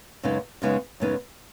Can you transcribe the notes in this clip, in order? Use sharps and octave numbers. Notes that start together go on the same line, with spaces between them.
F#2 C#3 G#3 B3 D#4
F#2 C#3 G#3 B3 D#4
F#2 C#3 G#3 B3 D#4